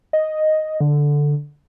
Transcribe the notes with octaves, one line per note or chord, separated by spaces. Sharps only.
D#5
D3